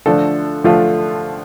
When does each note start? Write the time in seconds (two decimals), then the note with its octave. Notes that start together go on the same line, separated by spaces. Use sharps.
0.06 D3 F3 A3 D4 F4 A4
0.64 D3 F3 A3 D4 F4